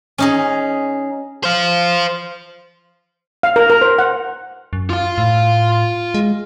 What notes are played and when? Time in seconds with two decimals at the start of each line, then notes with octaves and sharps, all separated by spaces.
0.18 C#4 D#4 G#4
1.44 C5 F5
3.43 F5
3.56 A#4
3.70 A#4
3.81 C5
3.99 F#5
4.73 F#2
4.90 F4 F5
5.18 A2
6.14 G#3